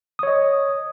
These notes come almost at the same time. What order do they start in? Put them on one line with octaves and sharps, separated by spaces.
D#6 C#5 D#5